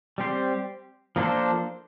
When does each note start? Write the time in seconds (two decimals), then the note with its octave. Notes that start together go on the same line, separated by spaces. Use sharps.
0.18 G3 C4 G4 C5
1.16 F3 A#3 D4 A4 C5